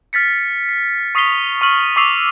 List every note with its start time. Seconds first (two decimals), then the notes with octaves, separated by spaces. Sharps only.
0.13 F6 A6 B6 C#7
0.69 C7
1.15 C#6 D#6 B6 C7 F7 G7
1.61 C#6 F6 F#7
1.96 C#6 D6 E6 C7 F7